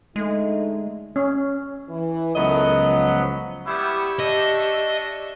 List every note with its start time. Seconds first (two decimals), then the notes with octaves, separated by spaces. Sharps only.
0.16 D3 G#3 A3 D#4
1.16 C#4
1.89 E3
2.35 C#2 F#3 A3 B3 A#4 D#5
2.79 F3
3.67 G3 B3 E4 G4 E5 C#6
4.20 D4 D#5